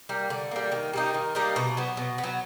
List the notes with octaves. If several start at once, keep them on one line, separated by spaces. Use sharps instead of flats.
G3 A#3
D3
G3 A#3
D#3
G3 A#3 D#4
D#3
G3 A#3 D#4
B2
F#3 B3
B2
B3
F#3